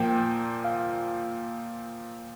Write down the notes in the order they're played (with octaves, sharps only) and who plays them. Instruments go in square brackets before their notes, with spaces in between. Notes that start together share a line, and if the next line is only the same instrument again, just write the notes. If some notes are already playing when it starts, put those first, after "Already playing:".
Already playing: [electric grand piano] A#2 F3 A#3 [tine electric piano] G5
[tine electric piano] F5